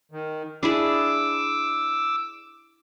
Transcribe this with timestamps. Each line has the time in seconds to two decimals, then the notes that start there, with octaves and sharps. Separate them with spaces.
0.12 D#3
0.63 D4 E4 G#4 D6 E6